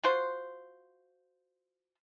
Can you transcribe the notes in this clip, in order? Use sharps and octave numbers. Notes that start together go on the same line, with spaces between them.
F4 F#4 C5